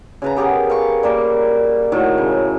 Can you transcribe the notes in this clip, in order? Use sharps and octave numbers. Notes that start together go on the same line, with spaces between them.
C#3 B4 A#5
B3 G4 G#4 A#4
F5 G#5 C#6
G3 A#3 A#4
A2 D#3 F#4
C#3